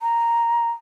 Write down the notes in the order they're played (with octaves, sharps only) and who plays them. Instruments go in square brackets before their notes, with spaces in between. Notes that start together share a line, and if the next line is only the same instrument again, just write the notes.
[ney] A#5